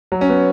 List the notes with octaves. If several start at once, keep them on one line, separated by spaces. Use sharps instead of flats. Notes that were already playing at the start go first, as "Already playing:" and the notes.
F#3
C#4
B3